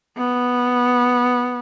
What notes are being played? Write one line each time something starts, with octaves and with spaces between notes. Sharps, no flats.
B3